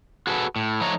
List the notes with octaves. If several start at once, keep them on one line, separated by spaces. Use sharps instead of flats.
F#4 G#4 A4 B4
A2
F3 A3 D#4 C#5 A#5